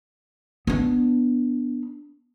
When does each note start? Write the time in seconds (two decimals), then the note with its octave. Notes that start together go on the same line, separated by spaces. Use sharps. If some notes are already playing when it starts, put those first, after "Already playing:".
0.67 B3 D4